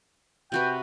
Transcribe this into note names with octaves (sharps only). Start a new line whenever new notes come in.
C3 F#4 B4 G5